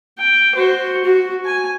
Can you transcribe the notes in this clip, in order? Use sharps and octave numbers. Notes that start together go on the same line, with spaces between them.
G5
F#4 C5
F#4
G#5